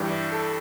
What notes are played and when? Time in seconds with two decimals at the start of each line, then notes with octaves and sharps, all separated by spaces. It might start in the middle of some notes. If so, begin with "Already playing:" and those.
Already playing: G2 E3 G3 G4
0.32 A4